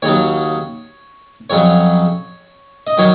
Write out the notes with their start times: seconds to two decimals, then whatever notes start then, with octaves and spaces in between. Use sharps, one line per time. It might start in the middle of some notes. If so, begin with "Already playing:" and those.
0.02 D#2 C#3 F#3 C#5
1.50 F2 C#3 F#3 C#5
2.87 D#5
2.97 D#3 F#3 C#5